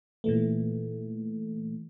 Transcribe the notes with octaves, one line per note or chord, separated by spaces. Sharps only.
A#2 E3 A3